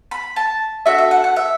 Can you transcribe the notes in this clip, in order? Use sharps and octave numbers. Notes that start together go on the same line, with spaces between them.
B5
A5
D4 F#4 A4 E5
E5
F#5
F#5
E5